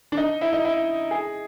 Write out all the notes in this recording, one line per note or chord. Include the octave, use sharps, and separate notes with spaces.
D4
D#4
E4
D#4
E4
G#4